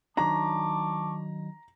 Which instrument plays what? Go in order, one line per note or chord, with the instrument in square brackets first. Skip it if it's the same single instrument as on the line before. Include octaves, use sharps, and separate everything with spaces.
[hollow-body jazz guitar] D#3 F#3 D4 [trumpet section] A5 C#6 D6 [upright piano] A#5